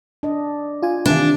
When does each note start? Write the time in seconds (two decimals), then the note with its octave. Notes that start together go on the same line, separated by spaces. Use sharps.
0.23 D4 D#5
0.82 F4 G#5
1.06 C3 D#3 E3 D4